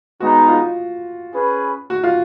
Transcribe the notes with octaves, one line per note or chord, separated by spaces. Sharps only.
G#3 B3 D#4 F#4
F4
C#4 G#4 B4
F#4
F4